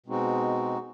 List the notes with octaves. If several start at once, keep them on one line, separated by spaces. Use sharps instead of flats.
B2 G#3 C4 D#4 F#4